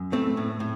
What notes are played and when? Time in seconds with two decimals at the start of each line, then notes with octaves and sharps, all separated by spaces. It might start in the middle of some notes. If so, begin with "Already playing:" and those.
Already playing: F#2
0.12 A2 A3 C4
0.37 A2
0.60 A2